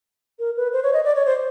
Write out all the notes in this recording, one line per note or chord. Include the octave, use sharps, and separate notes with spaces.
A#4
B4
C5
C#5
D#5
D5
C#5
C5